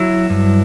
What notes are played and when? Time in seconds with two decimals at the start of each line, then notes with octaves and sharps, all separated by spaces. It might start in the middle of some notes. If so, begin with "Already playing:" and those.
Already playing: F#3 E4
0.30 G2